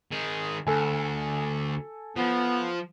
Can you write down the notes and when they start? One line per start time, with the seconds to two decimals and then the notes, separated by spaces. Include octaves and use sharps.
0.12 D#3 G#4
0.67 D2 A4 G#5
2.16 F3 B3